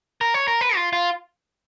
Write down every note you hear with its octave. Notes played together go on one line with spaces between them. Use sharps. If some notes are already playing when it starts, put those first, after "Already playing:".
A#4
C#5
A#4
B4
F4
F4